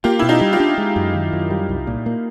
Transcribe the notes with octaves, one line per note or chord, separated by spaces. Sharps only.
A#3 F4 G4
B2 E4
D#4 F4
G3
F4 G4
D4
G#3
F#2
D#3
F#2
G3
C2
A#2
A#3